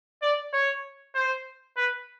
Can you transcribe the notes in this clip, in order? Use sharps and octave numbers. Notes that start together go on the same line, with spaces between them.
D5
C#5
C5
B4